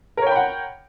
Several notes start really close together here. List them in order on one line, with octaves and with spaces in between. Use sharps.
A#4 C#5 G5 B5 F#5